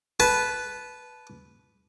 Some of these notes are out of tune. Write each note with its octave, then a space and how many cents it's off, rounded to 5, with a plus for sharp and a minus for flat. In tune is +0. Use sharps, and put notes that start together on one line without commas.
B4 +0 A5 -20